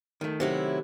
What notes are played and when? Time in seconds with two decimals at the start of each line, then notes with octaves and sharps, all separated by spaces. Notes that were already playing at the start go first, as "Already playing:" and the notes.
0.21 D#3 A3
0.40 C3 F#3 E4